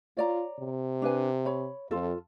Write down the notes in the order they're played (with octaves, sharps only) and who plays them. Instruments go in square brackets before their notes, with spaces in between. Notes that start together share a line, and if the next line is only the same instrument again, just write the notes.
[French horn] F4 [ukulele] C#5 D5 A#5
[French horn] C3
[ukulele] D4 B4 G#5
C#5 B5
[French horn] F2 [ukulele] F4 A4